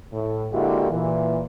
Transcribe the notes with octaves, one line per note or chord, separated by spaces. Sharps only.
A2
D3 G#3 A#3 E4 F#4 G4
A#2 E3